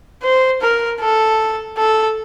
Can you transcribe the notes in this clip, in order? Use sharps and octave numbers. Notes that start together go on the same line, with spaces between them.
C5
A#4
A4
A4